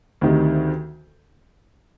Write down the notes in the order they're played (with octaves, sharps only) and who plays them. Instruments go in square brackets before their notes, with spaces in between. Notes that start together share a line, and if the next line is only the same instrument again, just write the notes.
[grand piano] D2 C3 D#3